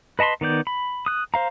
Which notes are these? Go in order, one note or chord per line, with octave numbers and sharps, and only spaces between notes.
B4 D#5 A5 B5 C6
D#3 B3 D5 G6
B5
D#6 F#6
C5 F5 A#5